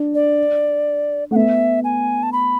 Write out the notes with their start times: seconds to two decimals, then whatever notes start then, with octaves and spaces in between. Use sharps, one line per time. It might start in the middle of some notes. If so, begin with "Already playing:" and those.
Already playing: D4
0.15 D5
1.31 A3 F#5
1.36 B3 E5
1.84 G#5
2.23 A5
2.32 B5